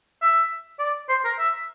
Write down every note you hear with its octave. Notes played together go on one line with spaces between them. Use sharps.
E5
D5
C5
A#4
E5